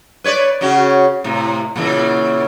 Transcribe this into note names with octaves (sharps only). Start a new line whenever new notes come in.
B4 C#5 D5
C#3 C#4 F#4
A2 C3
A#2 C#3 E3